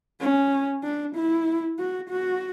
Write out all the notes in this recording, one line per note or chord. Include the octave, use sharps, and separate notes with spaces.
C#4
D4
E4
F#4
F#4